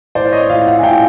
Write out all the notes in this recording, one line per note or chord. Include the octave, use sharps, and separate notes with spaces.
A2 C5 D5
C#5 D#5
A2 D#5 F5
E5 F#5
G#5
A2 F5 G5